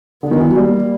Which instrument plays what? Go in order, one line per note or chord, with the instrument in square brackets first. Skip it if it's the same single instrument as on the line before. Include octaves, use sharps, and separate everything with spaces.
[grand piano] D3 [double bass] B3
[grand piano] D#3
E3
F#3
[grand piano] G3 [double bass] A#3